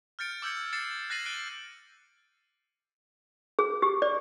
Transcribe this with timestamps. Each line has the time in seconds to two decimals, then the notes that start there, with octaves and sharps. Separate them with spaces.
0.19 F6 G6 A6 C#7 D7
0.42 D6 E6 G6 G#6 C#7
0.73 A6 C7 C#7 E7
1.10 F#6 A6 A#6 C7 D#7 F#7
1.25 F#6 C7 D7 D#7 F#7 G7
3.59 G#4
3.82 G4
4.02 D5